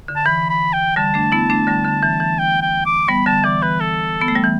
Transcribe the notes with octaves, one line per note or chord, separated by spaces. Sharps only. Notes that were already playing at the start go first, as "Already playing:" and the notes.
D3
A5
E3 B5
B5
G5
D3 G3 A5
A3 D4
B3 E4
A3 D4
D3 G3
D3
E3
E3
G5
G5
D6
G3 B3 B5
D3 G3 A5
E3 D5
E3 B4
A4
B3
A3
G3
E3